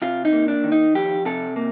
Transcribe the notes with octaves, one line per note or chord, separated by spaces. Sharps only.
C3 F4
D#4
A#3
D4
D#3
D#4
F2 G4
C3 A4
A#3